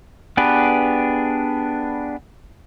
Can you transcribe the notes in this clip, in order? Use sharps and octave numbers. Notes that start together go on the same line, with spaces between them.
B3 D4 G4 G#4 B4